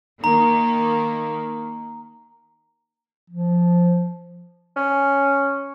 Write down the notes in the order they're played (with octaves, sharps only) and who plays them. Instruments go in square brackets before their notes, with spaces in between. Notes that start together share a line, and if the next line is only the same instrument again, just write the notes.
[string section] D#3 A#3 [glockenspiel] A#5
[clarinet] F3
[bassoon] C#4